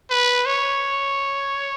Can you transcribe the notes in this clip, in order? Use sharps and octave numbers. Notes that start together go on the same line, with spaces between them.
B4
C#5